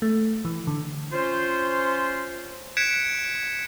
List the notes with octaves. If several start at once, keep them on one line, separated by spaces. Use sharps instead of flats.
A3
E3
D3
C#4 F4 C5
F#6 G#6 B6 C#7 D7 E7